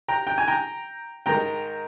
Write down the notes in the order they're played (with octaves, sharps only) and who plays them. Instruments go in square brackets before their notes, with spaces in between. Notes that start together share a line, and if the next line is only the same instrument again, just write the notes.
[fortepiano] G5 A#5
G5
G#5
G5 A#5
G#2 D#3 G#3 G5 A#5